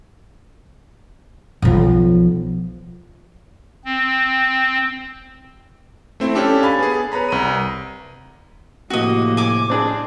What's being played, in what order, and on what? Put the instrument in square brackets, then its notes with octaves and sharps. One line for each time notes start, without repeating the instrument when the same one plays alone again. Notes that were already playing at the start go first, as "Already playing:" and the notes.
[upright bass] B1 F3
[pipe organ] C4
[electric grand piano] A3 C4 E4
C#4 D4 G4 A4
F5 G#5 B5 A6
B3 G#4
B4 C#5 A#5 B5
C2 A#5 D#7
[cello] A2 [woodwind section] C3 F3 A#3 [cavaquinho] F#4 D#5
[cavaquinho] G#5 D6
[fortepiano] C4 D4 G#4